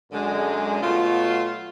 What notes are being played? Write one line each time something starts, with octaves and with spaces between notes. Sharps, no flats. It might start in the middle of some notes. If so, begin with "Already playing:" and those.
F#2 D3 G#3
B2 F#3 A3 F4